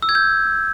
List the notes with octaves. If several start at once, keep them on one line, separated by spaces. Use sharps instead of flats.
E6
G#6
G6